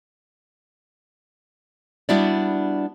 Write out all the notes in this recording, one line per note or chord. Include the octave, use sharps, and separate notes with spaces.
G3 B3 D4 E4 F#4 D5